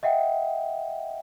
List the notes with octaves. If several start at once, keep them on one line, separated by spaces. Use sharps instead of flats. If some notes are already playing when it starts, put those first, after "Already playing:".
D#5 E5 F#5 G5